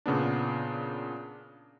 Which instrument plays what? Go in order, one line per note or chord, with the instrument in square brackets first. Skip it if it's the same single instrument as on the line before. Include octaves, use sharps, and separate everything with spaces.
[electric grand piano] A#2 C#3 B3 D4